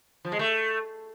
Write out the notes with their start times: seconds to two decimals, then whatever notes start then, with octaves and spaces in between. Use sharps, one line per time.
0.25 F3
0.32 G#3
0.39 A3